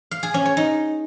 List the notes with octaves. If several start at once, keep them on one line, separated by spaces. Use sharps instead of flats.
F5
G#4
C#4
C#5
D#4